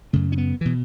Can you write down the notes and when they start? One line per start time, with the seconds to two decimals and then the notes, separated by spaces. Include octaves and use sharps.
0.13 F#2 C#3 A3
0.32 C#4
0.38 B3
0.61 B2 E3